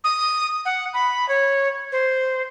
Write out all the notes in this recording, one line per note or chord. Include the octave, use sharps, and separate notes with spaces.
D#6
F#5
B5
C#5
C5